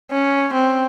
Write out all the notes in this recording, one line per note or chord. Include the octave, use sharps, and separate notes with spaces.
C#4
C4